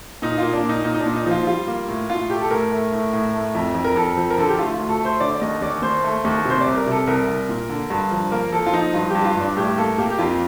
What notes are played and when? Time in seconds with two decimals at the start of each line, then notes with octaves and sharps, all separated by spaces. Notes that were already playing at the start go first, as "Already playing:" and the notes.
0.22 A#2 D#4
0.38 A#3 F4
0.53 D4
0.64 A#2
0.69 D#4
0.84 A#2 D#4
0.94 D#4
1.00 D4
1.06 A#2
1.16 D#4
1.26 F3 F4
1.47 G3 F4
1.68 A#3
1.88 A2
2.09 A2 F4
2.30 A3 G4
2.41 A4
2.50 A2 A#4
2.71 A3
2.92 A2
3.13 A2
3.34 A3
3.55 F2
3.75 F2
3.84 A#4
3.96 F2 A4
4.17 F3
4.30 A#4
4.37 D3 A4
4.49 G4
4.59 A3 F4
4.74 F4
4.79 D2
4.89 A4
5.00 A3
5.05 C5
5.20 D3 D5
5.35 D5
5.41 D#2 D#5
5.62 D#2 D5
5.82 D#2 C5
6.03 A3
6.25 D#2
6.45 C3 C5
6.61 D5
6.66 C2
6.76 A#4
6.86 C3
6.91 A4
7.07 C2 A#4
7.28 C2
7.49 A#2
7.69 D3
7.90 G2
8.11 F3
8.32 A#3 A#4
8.52 F3 A4
8.66 F4
8.74 F3 D#4
8.94 G2 F4
9.10 G4
9.15 G2
9.25 F4
9.35 G2
9.41 D4
9.57 A2 G4
9.77 A#3 A4
9.98 A#3 G4
10.10 G4
10.19 F2 F4